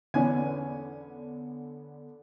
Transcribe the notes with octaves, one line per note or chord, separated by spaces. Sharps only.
E2 D3 B3 C#4 G#5